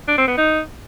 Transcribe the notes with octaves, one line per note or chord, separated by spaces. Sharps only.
D4
C4
B3
D#4